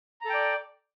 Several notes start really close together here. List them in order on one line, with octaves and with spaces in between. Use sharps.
A#5 A4 G5 D5